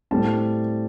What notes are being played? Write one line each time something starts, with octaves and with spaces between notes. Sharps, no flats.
A2 G3 C4 A5